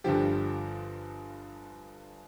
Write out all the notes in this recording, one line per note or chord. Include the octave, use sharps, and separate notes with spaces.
G1 G2 D3 F3 G4